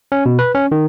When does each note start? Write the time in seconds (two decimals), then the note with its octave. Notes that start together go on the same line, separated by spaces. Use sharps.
0.12 C#4
0.26 B2
0.39 B4
0.55 C#4
0.72 D#3